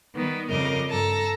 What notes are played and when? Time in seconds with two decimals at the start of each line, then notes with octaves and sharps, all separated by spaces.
0.15 D#3 G3 B3
0.48 F2 C#3 G3 A#4 D#5 D6
0.88 G2 A4 A5 A#5